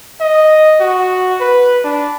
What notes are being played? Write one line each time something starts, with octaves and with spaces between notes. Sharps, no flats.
D#5
F#4
B4
D4